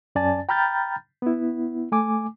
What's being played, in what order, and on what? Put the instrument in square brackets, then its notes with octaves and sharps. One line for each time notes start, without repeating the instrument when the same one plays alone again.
[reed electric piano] F#2 C#4 D5 G#5 A5 A6
G5 A#5 B5 F6 G6 A6
B3 E4
A3 G#5 D6